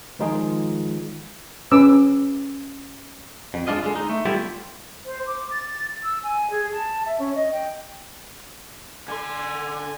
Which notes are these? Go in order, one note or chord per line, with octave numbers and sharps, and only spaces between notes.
D#3 F3 G#3 D#4 F4 G#4
C#4 B4 D6 E6
F2
G#3 A#3 D4 F4 D#5
D3 G#3
D#4
A3
G3 B3 E4 F4 G4 A4
C5
D6
A6
E6
G#5
G#4
A5
E5
C#4
D#5
G5
D3 G#5 C6